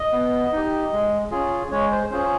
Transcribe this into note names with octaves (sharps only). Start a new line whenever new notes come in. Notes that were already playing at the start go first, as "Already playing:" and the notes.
Already playing: D#5
B3
D#4 G4
G#3
C#4 F4 G#4
G#3 C#5
C5
C#4 F4 G#4 C5